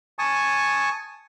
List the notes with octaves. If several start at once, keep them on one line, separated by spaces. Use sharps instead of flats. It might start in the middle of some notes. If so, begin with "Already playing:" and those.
G#5 A5 C#6 D#6